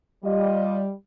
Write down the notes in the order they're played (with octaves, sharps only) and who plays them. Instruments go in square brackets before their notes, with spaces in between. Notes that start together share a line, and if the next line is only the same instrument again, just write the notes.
[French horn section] G3 [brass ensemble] F4 D5 D#5